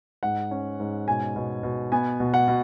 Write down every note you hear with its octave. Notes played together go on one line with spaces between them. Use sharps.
G#2 F#5
C#4
G#2
B2 G#5
B2
B2
B3 G#5
B2
F#5
B2